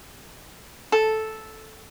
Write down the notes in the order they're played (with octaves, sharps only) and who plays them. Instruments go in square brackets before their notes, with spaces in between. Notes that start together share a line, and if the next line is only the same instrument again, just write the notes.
[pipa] A4